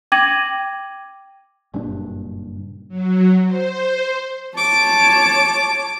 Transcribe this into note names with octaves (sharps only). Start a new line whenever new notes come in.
G5 D6 G#6 A#6 D#7 F#7
F#1 G2 A#2 D4
F#3
C5
C#5 A5 D6